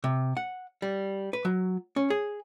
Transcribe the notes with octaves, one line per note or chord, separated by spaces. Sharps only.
C3
F#5
G3
B4
F#3
C#4
G#4